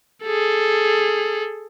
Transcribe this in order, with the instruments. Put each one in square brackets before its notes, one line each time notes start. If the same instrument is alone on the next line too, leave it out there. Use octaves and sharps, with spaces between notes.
[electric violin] G#4 A4